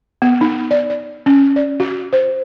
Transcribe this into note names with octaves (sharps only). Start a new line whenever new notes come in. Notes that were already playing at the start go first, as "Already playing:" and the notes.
B3
D#4
D5
D5
C#4
D5
F#4
C5